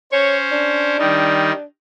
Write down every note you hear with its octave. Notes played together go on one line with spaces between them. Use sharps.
C#4 C5 C#5
D4
D#3 G3 D#4